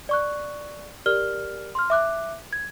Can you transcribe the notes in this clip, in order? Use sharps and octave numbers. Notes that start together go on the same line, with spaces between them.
D5 C#6 F#6
G4 A#4 D5 F6 G7
C6 F6
E5 D6 F#6
G#6